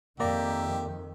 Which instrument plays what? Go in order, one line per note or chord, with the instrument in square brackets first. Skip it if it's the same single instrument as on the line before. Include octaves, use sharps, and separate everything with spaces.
[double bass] F2 D#3 [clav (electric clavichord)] A#3 D5 A#5 [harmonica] G4 E5